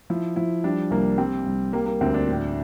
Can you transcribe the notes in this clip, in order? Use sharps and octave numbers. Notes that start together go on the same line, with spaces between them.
F3 E4
F3 E4
G3 D4
C2 A#3
G3 C4
C2
G3 A#3
A#3
D2 C4
D4
A2